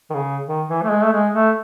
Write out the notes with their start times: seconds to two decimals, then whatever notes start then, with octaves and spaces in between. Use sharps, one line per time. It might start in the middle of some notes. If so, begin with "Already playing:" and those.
0.10 D#3
0.14 C#3
0.47 D#3
0.68 E3
0.83 A3
0.90 G#3
1.04 A3
1.12 G#3
1.34 A3